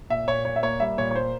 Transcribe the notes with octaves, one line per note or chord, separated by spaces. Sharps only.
A#2 E5
A#2 C#5
A#2 C#5
E5
A#3 C#5
G3 E5
A#2 C#5
C#5
A#3 C5